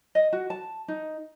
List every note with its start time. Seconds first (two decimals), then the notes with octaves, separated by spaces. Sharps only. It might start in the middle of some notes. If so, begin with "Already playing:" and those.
0.15 D#5
0.33 F#4
0.50 A5
0.88 D#4